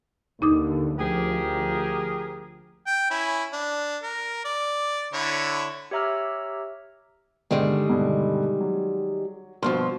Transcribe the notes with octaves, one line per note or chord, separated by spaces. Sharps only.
D#2 D3 D#4 D6 D#6
D2 F3 G4 G#4 A#4
G5
C#4 E4
D4
A#4
D5
D3 E4 C#5
G4 C#5 E5 A#5 E6 F6
G2 D3 D#3 G3 G#3
G2 B2 D3
F#3
G2 B2 F3 C6 F6